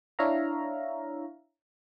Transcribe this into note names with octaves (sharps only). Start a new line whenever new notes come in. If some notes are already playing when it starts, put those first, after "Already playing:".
D4 E4 C#5 E5 F5 A#5